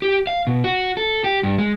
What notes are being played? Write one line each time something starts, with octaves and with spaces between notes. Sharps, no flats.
G4
F5
B2
F#4
A4
G4
G2
G#3